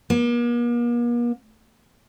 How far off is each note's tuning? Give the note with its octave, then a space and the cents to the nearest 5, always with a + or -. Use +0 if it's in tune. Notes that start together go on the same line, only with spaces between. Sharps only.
A#3 +45